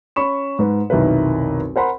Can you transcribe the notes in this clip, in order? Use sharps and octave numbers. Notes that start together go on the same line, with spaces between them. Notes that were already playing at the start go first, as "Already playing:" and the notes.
C#4 B5 C#6 E7
G#2 B4
F1 B1 D#3 E4 A#4 B4
A#4 C5 F#5 B5 C6